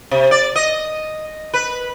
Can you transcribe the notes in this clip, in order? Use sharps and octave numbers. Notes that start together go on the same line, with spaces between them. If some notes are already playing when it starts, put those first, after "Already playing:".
C3
D5
D#5
B4